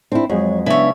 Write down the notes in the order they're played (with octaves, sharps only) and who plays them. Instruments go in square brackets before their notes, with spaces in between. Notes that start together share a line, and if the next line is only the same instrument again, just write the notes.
[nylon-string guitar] C4 E4 [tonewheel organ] D4 C5
[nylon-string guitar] F2 [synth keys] F#3 G#3 [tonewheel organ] C#5
[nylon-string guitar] C#3 [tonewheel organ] B3 D4 E5 [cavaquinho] E4 C#5